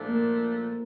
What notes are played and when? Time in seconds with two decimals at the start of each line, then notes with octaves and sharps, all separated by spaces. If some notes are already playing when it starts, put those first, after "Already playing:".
Already playing: A#2 F3 A3 D4
0.08 A#3